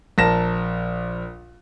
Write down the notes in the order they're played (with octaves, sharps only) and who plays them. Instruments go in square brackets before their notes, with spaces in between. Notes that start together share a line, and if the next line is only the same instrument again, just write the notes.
[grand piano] A#1 A#4 A5 A#6 E7